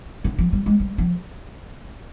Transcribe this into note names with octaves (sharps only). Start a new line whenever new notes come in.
D3
F3
G3
G#3
G3
F3